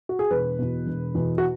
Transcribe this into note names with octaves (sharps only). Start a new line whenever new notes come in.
F#4
G#4
E1 B4
E2 B2
E1
E2 B2
F#4